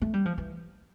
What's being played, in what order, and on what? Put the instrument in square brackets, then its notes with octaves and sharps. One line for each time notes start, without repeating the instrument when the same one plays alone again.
[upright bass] A3
G3
F3
E3